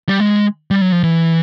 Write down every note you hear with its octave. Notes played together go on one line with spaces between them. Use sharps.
G3
G#3
G3
F#3
F3
E3